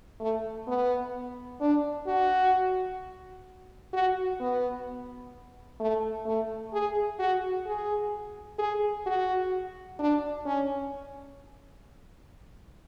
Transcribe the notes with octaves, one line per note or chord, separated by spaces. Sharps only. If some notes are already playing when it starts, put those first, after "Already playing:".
A3
B3
D4
F#4
F#4
B3
A3
A3
G#4
F#4
G#4
G#4
F#4
D4
C#4